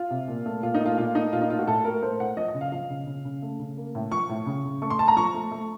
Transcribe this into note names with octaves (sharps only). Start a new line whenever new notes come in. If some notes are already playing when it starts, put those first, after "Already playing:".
Already playing: F4
C3
A#2
A3
A#2 F4
D#4
A3
F4
A#2 F4
A3 D#4
A#2 F4
D#4
A3 F4
F#4
A2 A4
A3 A#4
A3 C5
A2 F#5
F3 D#5
D#5
C#3
F5
F3 F5
C#3
C#3
C#3
A3
C#3
A#3
A2
F3 C#6
A2
C#3
C#3
A3 C#6
C6
A3 A5
A#5
F3 C#6
A3
A3